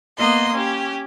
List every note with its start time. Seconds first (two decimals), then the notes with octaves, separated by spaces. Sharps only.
0.18 A#3 B3 D#5 C6
0.54 C#4 G4